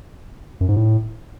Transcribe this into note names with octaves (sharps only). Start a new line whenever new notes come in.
F#2
G#2
A2